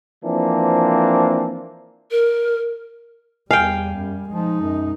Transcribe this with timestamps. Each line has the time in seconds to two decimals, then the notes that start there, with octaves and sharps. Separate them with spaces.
0.25 E3 F3 A#3 C4 D4
2.11 A#4
3.51 E2 G3 F5 G5 G#5
3.94 F#2
4.29 F3 G#3 D#4
4.61 F#2